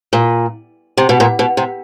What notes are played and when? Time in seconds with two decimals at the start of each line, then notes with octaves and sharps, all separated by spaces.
0.13 A#2
0.97 C3
1.09 B2
1.20 A#2
1.39 B2
1.57 C3